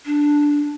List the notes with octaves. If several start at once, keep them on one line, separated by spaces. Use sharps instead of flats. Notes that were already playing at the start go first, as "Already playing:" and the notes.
D4